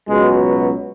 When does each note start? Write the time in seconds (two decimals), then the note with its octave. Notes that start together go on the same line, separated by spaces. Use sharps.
0.08 C#2 B2 F#3 G#3